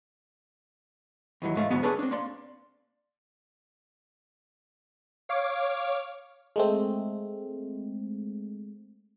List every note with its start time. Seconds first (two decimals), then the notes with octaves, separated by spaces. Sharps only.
1.42 D#2 E3 F#3
1.55 G#2 A3 F5
1.70 D2 G#2 F#3 B3
1.83 D4 G#4 A4 B4 C#5
1.99 C4 D4
2.11 A#3 D5 C6
5.29 C#5 F5 D6
6.56 G#3 A3 C4